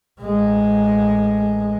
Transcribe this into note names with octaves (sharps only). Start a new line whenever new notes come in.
A1 G#3